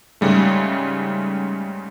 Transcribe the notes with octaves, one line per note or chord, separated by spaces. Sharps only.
G#2 C#3 G3 A3